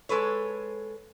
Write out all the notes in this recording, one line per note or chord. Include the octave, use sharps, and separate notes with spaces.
G#3 A4 B4 C#5